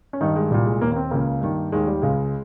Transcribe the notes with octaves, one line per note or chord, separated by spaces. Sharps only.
C#4
G2 D#3 D#4
G#3
C2 A#2 G3
G#3
D#2 D#3 A#3
A#3
C4
C#2 C#3 A#3
G2 D#3
D#2 D#3 G#3
G3
C#2 C#3 G#3